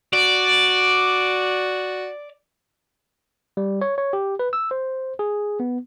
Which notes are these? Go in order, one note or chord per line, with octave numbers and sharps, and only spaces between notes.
F#4 D5
G3
C#5
C#5
G4
B4
E6
C5
G#4
B3